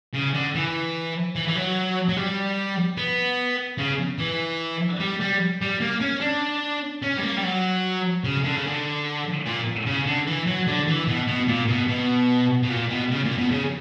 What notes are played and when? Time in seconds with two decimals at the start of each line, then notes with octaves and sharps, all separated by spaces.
0.13 C#3
0.34 D3
0.55 E3
1.36 E3
1.48 E3
1.56 F#3
2.09 F#3
2.17 G3
2.98 B3
3.78 C#3
4.19 E3
5.00 G3
5.20 G3
5.61 G3
5.80 A#3
6.01 C#4
6.21 D4
7.02 C#4
7.17 G3
7.22 A#3
7.37 G3
7.43 F#3
8.24 C#3
8.44 D3
8.56 C#3
8.67 D3
9.45 A#2
9.86 C#3
10.06 D3
10.27 E3
10.47 F#3
10.67 D3
10.88 E3
11.07 B2
11.27 B2
11.48 A#2
11.68 B2
11.88 B2
12.63 B2
12.70 A#2
12.89 B2
13.11 C#3
13.24 A#2
13.37 B2
13.51 C#3